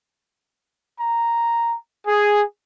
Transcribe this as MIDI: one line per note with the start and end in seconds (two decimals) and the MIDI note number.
0.99 1.74 82
2.08 2.42 68